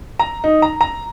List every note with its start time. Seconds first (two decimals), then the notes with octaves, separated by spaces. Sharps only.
0.19 A#5
0.44 D#4
0.62 A#5
0.81 A#5